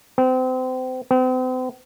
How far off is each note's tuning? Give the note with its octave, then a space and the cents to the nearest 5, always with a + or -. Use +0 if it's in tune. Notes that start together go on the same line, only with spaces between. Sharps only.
C4 -30
C4 -40